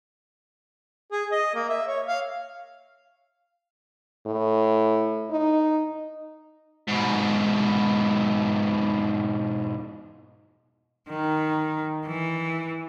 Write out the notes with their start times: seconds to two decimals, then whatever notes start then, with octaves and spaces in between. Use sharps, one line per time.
1.12 G#4
1.31 D#5
1.55 A#3
1.69 E5
1.87 C#5
2.07 F5
4.26 A2
5.30 D#4
6.88 G#2 B2
11.09 D#3
12.06 E3